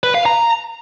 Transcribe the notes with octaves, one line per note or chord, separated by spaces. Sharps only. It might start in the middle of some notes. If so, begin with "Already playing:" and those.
B4
F5
A#5